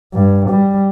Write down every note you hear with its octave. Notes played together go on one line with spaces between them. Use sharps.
G2
G3